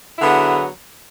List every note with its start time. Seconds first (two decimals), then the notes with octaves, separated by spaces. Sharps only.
0.17 E4
0.20 D3
0.23 B3
0.25 G#4
0.28 F#3